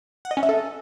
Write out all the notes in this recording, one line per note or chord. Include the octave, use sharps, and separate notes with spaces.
F#5
D#5
C#4
E5
A4